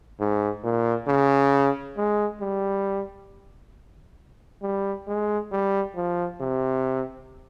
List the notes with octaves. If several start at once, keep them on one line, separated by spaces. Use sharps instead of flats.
G#2
A#2
C#3
G#3
G3
G3
G#3
G3
F3
C3